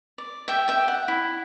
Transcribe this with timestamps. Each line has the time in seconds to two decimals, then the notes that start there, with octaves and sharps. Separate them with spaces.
0.18 D5
0.48 G4 E5 G5
0.68 E5 G5
0.78 D5
0.88 F#5
1.08 E4